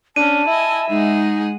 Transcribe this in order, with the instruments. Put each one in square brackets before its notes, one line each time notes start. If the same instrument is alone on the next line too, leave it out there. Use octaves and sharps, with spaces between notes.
[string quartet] C#4 [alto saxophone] D4 [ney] A5 [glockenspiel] D#7
[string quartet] E4 D#5 G#5 [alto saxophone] E5
[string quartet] G#3 G#4 F#5 [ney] D#4